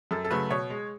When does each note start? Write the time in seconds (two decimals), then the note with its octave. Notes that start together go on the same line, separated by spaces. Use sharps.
0.11 F#2 A4
0.24 A4
0.31 C#3 F#3 A3 B4
0.51 B2 C#5
0.70 G#3